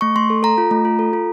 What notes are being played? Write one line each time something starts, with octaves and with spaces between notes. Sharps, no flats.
A3 C#6
A3 C6
A4
A4 A#5
F4
A3
F4
A4
F4